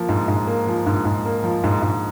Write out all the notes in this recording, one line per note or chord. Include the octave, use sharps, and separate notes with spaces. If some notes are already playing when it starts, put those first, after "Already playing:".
Already playing: F3 A#3
G#2
G#2
A#3
F3
G#2
G#2
A#3
F3
G#2
G#2